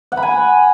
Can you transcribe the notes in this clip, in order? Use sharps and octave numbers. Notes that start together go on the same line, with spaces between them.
F#5
B5
G#5